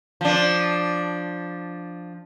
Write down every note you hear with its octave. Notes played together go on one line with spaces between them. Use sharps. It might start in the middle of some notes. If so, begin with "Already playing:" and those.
F3 D4